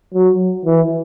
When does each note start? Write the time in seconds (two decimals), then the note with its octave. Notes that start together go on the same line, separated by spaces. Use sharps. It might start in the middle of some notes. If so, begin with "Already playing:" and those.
0.14 F#3
0.65 E3